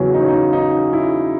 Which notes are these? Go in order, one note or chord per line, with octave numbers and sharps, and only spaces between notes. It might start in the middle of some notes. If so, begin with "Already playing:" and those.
Already playing: E2 C#3 F#3 C#4
D#4
C#4
D#4
D#4
E4